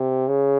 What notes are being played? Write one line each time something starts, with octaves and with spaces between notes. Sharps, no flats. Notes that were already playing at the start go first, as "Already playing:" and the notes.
Already playing: C3
C#3